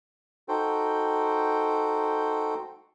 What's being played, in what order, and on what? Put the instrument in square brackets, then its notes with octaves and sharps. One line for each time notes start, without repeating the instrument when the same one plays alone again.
[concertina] D#4 F#4 A4 C5 G5